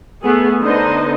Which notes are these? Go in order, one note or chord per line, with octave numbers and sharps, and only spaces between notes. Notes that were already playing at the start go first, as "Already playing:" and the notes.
A3 B3 G#4
D3 B3 D#4 C5 D#5